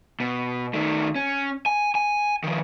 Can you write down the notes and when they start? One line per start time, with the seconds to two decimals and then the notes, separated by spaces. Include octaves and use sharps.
0.20 B2
0.74 D#3 A3
1.16 C#4
1.66 G#5
1.95 G#5
2.44 D#3 F3